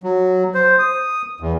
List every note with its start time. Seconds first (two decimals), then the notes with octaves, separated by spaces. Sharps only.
0.03 F#3
0.54 C5
0.79 D#6
1.40 E2